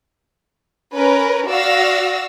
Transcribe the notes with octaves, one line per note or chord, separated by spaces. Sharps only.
C#4 A#4 B4
F#4 D5 F5 E6 A#6